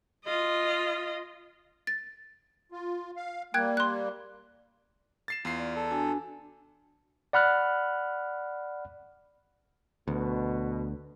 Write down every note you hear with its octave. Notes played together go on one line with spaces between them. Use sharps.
F4 D#5
A6
F4
F5
G3 A#3 G5 F#6 G#6
C6 F#6
A6 C7 E7
E2 F4 C7
D5
A4
D4 F#4 G#5
D5 F#5 B5 F6 F#6
D2 B2